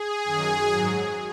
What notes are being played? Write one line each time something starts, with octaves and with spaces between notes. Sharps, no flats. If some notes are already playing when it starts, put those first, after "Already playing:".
Already playing: G#4
F#2 D#3 F#3
G#2 F#3